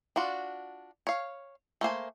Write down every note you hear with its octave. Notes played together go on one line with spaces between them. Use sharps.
D4 F4 F#4
C#5 F5
A3 A#3 C5 G#5